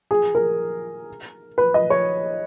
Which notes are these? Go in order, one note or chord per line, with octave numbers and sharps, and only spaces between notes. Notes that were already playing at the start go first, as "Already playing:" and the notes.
G#4
A#4
B4
D#5
C#5